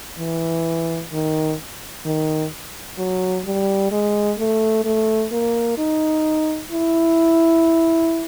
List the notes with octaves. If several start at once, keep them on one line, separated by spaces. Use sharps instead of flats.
E3
D#3
D#3
F#3
G3
G#3
A3
A3
A#3
D#4
E4